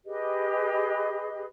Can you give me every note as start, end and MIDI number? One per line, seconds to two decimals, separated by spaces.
0.05 1.44 67
0.05 1.44 68
0.05 1.44 71
0.05 1.44 75